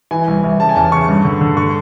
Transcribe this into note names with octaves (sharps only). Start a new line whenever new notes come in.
E3 G#5
C2
C2
C#3 A5
G#5
E2 A5
C#3 C#6
G2
D3
D3
D3 C#6